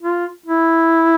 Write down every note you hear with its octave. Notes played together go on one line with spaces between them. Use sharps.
F4
E4